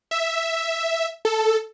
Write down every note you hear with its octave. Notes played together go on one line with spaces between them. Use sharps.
E5
A4